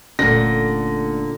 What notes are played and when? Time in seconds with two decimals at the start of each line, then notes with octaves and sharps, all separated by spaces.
0.19 F1 A#2 D3 A3 C#4 A#6